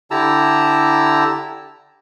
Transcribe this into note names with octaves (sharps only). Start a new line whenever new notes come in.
D3 E4 G4 A5 A#5 E6